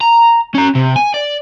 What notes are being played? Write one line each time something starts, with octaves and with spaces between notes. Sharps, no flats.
A#5
C#4 A#5
C3
G#5
D5